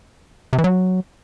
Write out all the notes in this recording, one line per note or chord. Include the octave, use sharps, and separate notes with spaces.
C3
E3
F#3